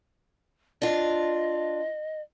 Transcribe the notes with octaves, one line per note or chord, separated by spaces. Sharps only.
D4 F4 D#5